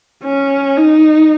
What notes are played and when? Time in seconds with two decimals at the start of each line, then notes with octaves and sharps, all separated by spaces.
0.23 C#4
0.77 D#4